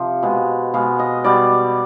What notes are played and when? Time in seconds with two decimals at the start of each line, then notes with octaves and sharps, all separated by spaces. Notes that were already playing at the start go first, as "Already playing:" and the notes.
Already playing: C3 F3
0.23 B2 G#3
0.74 B2 G#3 F5
0.99 D#5
1.24 B2 G3 D5